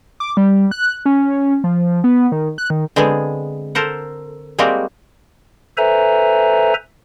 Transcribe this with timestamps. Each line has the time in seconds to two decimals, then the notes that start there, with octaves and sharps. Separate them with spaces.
0.20 D6
0.37 G3
0.71 F#6
1.06 C#4
1.64 F3
2.04 B3
2.32 D#3
2.58 F#6
2.70 D#3
2.96 D3 G#3 B3 C4 G#4
3.75 A4 A#4 C5 F#5
4.59 G3 G#3 A#3 C4 F#4 G4
5.77 A4 B4 C5 E5 G#5 A#5